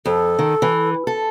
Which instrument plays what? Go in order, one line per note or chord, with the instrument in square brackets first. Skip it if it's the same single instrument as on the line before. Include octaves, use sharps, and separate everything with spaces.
[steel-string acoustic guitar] F2 [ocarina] A4
[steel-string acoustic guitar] D#3
E3
A4